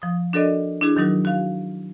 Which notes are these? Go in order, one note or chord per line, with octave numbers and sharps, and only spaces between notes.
F3 D#6
D4 F#4 A4 A#4 D5 D#5
D4 E4 F#4 G#4
D#3 F#3 D#4 F#4 A#4
F#4 F5